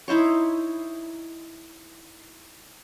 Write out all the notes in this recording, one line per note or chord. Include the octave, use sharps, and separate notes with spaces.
D#4 E4 C5 C#5